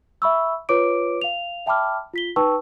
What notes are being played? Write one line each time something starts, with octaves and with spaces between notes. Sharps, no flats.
E5 B5 C#6 E6
F4 B4 C#5 D6 D7
F5 F7
E5 G5 A5 B5 D6 F6
F4 B6 G7
D#4 B4 G5 A5 C#6 E6